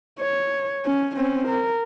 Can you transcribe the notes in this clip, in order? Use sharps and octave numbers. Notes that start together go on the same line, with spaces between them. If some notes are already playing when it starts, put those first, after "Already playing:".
C#5
C#4
C4 C#4
A#4